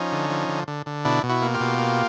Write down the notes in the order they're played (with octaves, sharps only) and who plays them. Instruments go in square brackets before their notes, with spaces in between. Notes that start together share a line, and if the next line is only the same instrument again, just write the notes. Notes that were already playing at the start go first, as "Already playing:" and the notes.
Already playing: [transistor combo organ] F3 C#4 D#4
D3
F3
D3
D3
D3
B2 D4 E4
B2
E4 F#4
A#3
F4 G4
B2
A#3